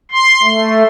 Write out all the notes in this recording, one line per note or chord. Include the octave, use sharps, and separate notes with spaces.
C6
A3